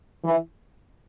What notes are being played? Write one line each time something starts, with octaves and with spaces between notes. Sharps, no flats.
E3